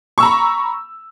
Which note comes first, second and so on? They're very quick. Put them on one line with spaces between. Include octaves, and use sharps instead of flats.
C#6 E6 A#5 B5